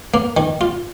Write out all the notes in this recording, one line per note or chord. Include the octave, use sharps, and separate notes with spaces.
A#3
D#3
F4